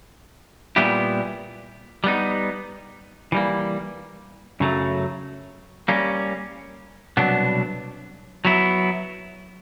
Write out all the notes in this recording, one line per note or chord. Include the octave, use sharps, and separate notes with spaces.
A#2 G3 B3 E4 G4
G3 B3 D#4
E3 G3 A#3
F#2 C#3 F#3 A3
G3 A#3 C#4
C2 B2 F#3 B3 D4
F#3 B3 E4